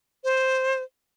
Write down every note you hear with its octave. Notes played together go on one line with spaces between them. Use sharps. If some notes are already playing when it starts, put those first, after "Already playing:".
C5